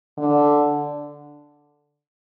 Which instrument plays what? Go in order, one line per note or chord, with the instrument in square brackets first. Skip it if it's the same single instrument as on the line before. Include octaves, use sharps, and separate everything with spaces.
[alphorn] D3